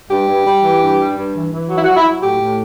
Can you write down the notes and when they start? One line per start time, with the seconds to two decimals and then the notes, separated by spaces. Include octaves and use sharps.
0.10 G2 G4
0.28 G2
0.45 G3
0.64 E3
0.80 G2
0.99 G3
1.17 G2
1.34 E3
1.51 E3
1.69 F#3
1.75 E4
1.83 F#3 F#4
1.96 E4
2.05 F#3
2.22 A2 G4
2.40 A2